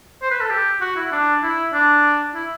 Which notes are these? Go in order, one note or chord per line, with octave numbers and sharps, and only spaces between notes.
C5
B4
A4
G4
F#4
E4
D4
E4
D4
E4